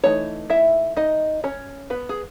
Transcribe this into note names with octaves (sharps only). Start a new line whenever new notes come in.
E3 A3 D#4 C#5
E4 E5
D#4 D#5
C#4 C#5
B3 B4
G#4